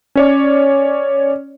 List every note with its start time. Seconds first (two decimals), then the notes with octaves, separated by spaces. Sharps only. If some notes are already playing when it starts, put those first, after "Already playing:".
0.15 C#4 C#5 D5